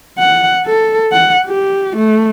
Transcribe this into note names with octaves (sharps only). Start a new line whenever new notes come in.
F#5
A4
F#5
G4
A3